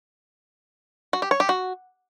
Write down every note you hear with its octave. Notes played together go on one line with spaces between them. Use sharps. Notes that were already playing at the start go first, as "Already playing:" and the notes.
F#4
G4
C#5
G4
F#4